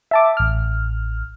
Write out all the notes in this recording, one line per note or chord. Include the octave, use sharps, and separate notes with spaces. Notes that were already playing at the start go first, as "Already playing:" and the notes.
E5 A5 D6
A1 F6